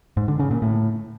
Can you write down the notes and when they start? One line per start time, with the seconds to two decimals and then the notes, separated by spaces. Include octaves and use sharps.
0.17 G#2
0.28 D3
0.39 C#3
0.51 A#2
0.62 A2